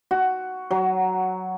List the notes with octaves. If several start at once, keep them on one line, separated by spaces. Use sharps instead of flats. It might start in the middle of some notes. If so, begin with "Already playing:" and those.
F#4
F#3